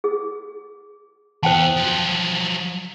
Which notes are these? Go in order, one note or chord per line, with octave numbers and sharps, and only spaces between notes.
G#4
E2 C5 G5 A5
F3 F#3